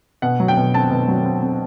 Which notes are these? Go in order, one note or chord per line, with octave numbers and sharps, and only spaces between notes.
B2 F#5
F#3
G5
B2
C4 A5
B2
F#3
C4
C4